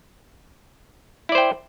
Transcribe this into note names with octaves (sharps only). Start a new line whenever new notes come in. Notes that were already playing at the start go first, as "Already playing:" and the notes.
E4 C5 D5 G5